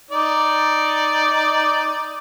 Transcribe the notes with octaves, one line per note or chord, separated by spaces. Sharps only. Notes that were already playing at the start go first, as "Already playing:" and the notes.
D#4 D5